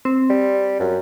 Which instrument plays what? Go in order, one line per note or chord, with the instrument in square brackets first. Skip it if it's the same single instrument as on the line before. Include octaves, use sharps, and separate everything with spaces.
[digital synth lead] C4
[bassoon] G3
F#2